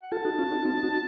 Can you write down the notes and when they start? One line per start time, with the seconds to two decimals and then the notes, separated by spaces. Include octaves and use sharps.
0.03 F#5
0.12 F4 A4 A5
0.25 D#4 F#4
0.38 C#4 F4
0.52 D#4 F#4
0.65 C4 D#4
0.83 D#4 F#4